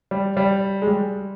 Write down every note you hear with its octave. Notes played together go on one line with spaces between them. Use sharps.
G3
G3
G#3
G3